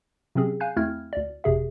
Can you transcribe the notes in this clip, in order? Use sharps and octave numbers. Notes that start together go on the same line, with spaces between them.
C3 F#3 C4 C#4 G#4
F5 G#5 F#6 G6
E2 A3 C4 E4 F6 G#6
D2 D5
G1 F2 C3 G#4 E5